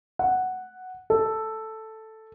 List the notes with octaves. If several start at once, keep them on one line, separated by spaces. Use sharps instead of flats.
F#5
A4